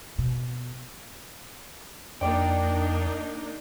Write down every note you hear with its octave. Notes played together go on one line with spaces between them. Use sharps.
B2
F2 A#3 D4 D#4 D5 D#5 G5